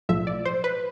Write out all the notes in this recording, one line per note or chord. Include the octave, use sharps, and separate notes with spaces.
B1 A2 F3 E5
D5
C5
B4